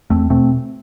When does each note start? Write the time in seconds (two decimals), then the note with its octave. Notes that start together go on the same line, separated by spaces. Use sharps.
0.10 E2 A3 C4
0.30 B2 A3 C4